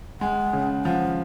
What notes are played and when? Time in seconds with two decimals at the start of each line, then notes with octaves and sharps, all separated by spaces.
0.20 G#3 F#5
0.53 C#3
0.84 F3 F#5